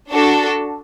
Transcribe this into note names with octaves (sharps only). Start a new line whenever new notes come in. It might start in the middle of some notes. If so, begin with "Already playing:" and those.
D4 F#4 A4